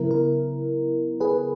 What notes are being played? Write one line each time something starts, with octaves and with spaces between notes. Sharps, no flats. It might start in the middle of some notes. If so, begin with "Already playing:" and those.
Already playing: C#3 F#3 B3 E4 A#4
A#4
G#4 B4